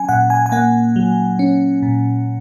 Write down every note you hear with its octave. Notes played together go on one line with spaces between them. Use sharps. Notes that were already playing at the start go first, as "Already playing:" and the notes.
Already playing: F#3 C#4 G#5
A#2 F#5
G#5
G#5
A#3 F#5
F#3
C#4
A#2